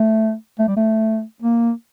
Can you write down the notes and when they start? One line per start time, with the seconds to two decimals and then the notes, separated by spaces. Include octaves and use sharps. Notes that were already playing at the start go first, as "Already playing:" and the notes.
Already playing: A3
0.59 A3
0.68 G3
0.76 A3
1.42 A#3